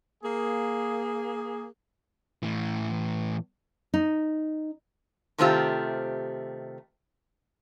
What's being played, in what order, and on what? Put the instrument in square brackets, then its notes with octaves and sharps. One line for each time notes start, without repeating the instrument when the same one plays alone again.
[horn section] A#3 G#4
[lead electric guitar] A2 E3
[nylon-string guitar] D#4
[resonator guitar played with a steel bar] C3 D#3 A3 C4 F4 G4